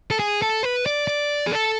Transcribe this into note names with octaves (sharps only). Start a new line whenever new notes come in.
A4
G#4
A4
B4
D5
D5
G#4
A4